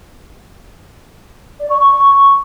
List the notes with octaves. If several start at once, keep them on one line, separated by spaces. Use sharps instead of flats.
D5
C#6
C#6